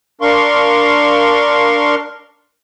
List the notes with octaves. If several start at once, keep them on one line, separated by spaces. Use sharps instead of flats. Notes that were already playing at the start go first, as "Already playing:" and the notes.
D4 A#4 F5 C6 C#6